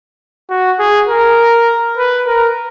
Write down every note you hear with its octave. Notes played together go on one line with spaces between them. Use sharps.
F#4
G#4
A#4
B4
A#4